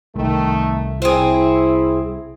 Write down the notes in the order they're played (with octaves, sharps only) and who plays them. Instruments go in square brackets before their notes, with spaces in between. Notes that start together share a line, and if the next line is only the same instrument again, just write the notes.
[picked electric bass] C2 [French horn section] D#3 A3
[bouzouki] C4 G#4 [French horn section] E4